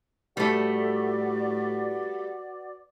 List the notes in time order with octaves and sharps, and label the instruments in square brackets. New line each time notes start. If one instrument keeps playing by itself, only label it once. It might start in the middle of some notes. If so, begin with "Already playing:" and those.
[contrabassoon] A2 [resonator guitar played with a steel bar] G3 A3 [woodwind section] F#4 B4 D5